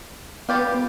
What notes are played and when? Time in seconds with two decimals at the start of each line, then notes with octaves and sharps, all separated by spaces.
0.49 B3 F4 G4 F5